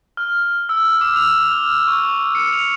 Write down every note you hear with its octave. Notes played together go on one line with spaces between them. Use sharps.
F6
E6
D6
F7
F6
C#6
C#7
F7